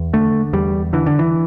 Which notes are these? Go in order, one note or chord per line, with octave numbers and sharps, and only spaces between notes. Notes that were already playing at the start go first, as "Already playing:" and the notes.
Already playing: E2
D3 A3
E2 G3
D3 E3
D3
E3